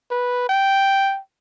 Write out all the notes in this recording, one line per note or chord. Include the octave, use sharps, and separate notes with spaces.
B4
G5